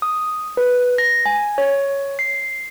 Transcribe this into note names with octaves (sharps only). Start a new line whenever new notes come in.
D#6
B4
A#6
G#5
C#5
C7